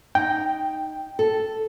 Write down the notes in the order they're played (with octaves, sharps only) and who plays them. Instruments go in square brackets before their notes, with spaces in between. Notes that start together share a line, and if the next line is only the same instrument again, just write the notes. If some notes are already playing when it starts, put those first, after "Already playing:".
[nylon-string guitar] D#4 [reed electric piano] G5
[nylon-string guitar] A4